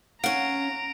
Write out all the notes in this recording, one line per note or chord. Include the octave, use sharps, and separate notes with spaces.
C#4 F5 F#5 A#5 D7